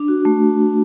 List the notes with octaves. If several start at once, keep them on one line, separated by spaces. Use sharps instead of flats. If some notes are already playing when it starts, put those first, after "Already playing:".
Already playing: D4
F#4
A3